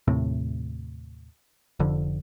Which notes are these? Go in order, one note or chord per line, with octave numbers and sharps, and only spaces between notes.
D#2 A2 C3
F1 F2 D3